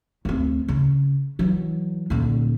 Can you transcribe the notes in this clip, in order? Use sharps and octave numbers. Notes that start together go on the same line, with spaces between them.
D2 C4
C#3
E3 F#3
D#1 D3